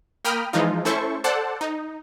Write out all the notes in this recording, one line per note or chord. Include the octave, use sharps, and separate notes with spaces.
A#3 A#4 G5 B5 D#6 F6
E3 F3 G#3 D#4 F4
A3 C#4 E4 A4 C5 C#6
A4 C5 D5 F#5 A5
D#4